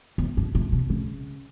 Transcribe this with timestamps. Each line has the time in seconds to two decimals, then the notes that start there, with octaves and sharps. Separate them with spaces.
0.18 E2
0.37 G2
0.55 A2
0.72 B2
0.90 C#3